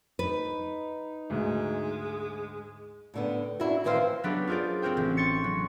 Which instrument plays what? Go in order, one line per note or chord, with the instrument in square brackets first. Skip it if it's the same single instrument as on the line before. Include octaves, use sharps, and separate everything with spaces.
[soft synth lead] D#4 [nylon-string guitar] B4
[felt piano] D2 G#2 [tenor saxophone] G#3
[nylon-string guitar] A2 D3 B3
D4 E4 F#4
A2 D#3 E3 C4 C5 F5
[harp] F#3 B3 D4 G4 A4
F4 G#4 A#4 C5 D5
C4 F#4 A#4 C5 G5
A1
C6 C#6 A6 C#7
F#3